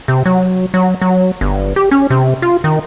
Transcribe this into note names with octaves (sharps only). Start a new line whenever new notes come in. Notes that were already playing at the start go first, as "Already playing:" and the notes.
C3
F#3
F#3
F#3
G1
G4
C#4
C3
F4
D#3